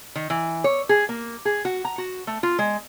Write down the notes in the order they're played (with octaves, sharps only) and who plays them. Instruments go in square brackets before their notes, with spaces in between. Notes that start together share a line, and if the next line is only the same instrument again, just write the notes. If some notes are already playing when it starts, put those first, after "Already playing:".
[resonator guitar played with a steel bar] D#3
E3
C#5
G#4
A#3
G#4
F#4
A#5
F#4
A3
F4
G#3